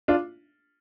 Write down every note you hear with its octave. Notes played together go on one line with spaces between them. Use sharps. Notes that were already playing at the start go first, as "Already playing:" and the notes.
D4 F4